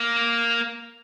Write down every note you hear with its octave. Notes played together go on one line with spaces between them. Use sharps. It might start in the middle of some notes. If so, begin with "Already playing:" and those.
Already playing: A#3